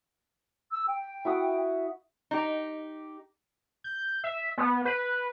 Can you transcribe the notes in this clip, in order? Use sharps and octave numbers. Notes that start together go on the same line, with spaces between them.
E6
G5
E4 F#4 D#6
D#4 G4
G6
E5
B3
B4